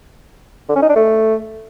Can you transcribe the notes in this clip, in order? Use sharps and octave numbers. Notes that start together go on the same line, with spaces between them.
D3
C#4
D#4
D4
A3